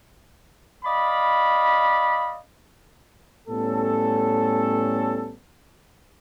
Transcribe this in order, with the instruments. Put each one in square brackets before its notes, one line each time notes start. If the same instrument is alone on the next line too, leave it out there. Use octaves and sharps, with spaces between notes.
[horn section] D5 D#5 F5 B5
[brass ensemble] A2 G3 B3 C#4 A4